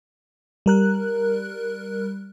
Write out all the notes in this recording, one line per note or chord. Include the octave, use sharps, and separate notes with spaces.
G3 A#4 F#6